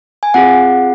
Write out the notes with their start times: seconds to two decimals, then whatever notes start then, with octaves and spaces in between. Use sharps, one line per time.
0.23 G#5
0.34 C4 F4 G#4 F#5